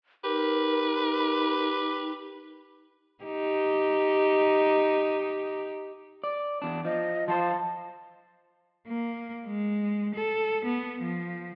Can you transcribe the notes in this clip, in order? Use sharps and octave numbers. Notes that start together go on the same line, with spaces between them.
D#4 G4 A#4 B4
D#4 G4
D5
E2 D4
F3 D#5
F3 F4 C5 A5
A#3
G#3
A4
B3
F3